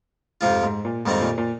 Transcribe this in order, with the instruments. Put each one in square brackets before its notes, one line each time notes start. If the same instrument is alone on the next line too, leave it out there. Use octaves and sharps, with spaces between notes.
[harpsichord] F2 C3 F3 C4 F4 [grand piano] G#2
[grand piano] G#2
A#2
[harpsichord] F2 D#3 G3 C4 D#4 [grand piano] G#2
[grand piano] A#2
A#2